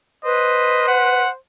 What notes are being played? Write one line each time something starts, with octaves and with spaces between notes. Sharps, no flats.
B4 C5 D#5
F#5